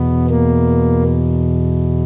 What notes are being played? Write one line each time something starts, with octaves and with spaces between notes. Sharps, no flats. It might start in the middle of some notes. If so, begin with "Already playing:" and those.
Already playing: E2 B2 B3
A#3